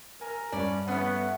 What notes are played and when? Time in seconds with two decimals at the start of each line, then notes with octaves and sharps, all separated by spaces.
0.21 A#4 G#5 F6
0.52 G2 C#4 D5
0.88 A3 B3 C#4 F#5